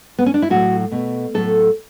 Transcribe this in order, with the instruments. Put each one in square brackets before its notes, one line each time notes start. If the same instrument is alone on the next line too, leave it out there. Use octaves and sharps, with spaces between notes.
[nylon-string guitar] B3
C#4
D4
E4
A2 F#3 A3 F#4
B2 A3
A2 F#3 A3 A4